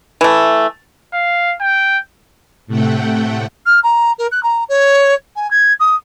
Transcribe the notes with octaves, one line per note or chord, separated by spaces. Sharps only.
E3 A3
F5
G5
A2 C3 A3 F#5 G5
F6
A#5
A#4
F#6
A#5
C#5
G#5
G#6
D#6